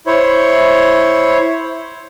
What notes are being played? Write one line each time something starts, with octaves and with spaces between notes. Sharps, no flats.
E4 C5 C#5